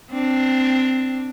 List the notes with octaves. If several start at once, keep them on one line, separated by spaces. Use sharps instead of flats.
C4 D4